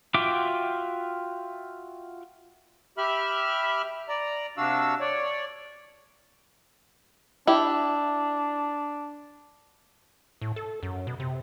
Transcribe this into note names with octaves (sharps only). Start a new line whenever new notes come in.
F4 F#4 E5 G5 D6
G4 E5 B5 F6
D5 A#5
C3 D4 F#4 F5 E6
C#5 D5
D4 E4 G4
A2
A4
F#2
B2
C3